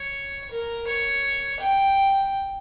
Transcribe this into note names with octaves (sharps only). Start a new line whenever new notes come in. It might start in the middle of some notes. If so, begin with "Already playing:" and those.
Already playing: C#5
A#4
C#5
G5